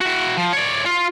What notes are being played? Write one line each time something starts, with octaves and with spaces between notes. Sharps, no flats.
E4 F#4
F3
C#5 D5
F4